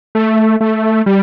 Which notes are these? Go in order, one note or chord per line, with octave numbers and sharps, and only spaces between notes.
A3
A3
G3